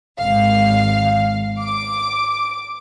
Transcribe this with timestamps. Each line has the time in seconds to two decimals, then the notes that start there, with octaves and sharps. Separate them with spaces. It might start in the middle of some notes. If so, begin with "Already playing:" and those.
0.19 G#1 F5
1.58 D6